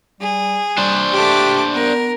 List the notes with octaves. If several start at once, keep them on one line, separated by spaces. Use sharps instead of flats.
G3 G#4
G3 D4 C5
A3 G4 D6
B3 A#4